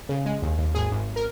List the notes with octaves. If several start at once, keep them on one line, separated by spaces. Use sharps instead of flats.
C#3
G#3
D#2
D#2
G#1 G#4
G#1
A#4